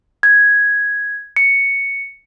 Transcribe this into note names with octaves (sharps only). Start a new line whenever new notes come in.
G#6
C#7